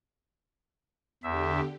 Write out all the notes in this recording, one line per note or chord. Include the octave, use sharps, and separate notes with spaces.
E2 D3 G4 E5